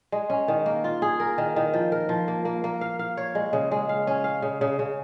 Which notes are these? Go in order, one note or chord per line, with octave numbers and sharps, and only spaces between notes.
G#3
C#4
D#3
A#3
F4
G#4
A#4
D#3
D#3
F3
A#4
F3
A#3
A#3
A#3
F5
F5
C#5
G#3
C#3
G#3
F5
C#4
F5
C#3
C#3
C#3